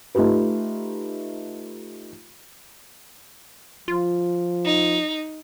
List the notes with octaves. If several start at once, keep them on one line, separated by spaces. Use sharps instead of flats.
A3 D#4 F4 G4 B4
F3 F4
D#4